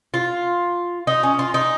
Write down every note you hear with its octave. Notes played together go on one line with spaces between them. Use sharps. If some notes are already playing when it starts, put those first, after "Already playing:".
F4
D#4
C#4
F4
D#4